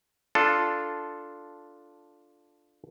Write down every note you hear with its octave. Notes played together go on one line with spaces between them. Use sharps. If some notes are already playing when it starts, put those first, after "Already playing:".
D4 F4 A4